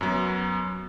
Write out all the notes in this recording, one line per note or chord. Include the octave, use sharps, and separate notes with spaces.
F#2 F#3 B3